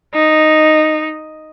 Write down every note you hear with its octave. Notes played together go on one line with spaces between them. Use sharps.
D#4